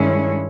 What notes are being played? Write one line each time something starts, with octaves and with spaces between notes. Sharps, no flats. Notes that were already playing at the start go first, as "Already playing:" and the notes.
Already playing: G2 D#3 G#3 C#4 E4